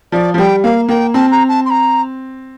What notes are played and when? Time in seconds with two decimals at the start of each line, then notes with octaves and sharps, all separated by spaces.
0.12 F3 D5
0.34 F3
0.38 G3 G5
0.63 A#3 F5
0.89 A#3 G5
1.14 C4 A5
1.31 A#5
1.48 A5
1.65 C6
1.70 A#5